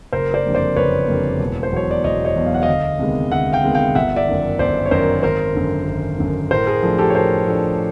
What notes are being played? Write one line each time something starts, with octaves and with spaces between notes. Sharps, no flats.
F#1 A#4 C5
C5 D5
F2 D3 G3 A#3
C5 D5
F#1 B4 C#5
F2 D3 G3 A#3
E1
C5
E2 B2 F#3 C#5
D5
E1 C#5 D#5
C#5 D#5
E2 B2 F#3
F5
F#5
D#5 F5
D2
C3 D#3 G#3 B3
D2 E5 F#5
F5 G5
C3 D#3 G#3 B3
F5 G5
G1 E5 F#5
D5 E5
F#2 D#3
G1 C5 D5
C#5
F#2 D#3 A#4 C5
G#1 A#4 C5
F#2 D3
G#1
F#2 D3
A2 A#4 C5
G#4 A#4
F3 A3 D4
G4 A4
C#5
A2 A#4 C5
F3 A3 D4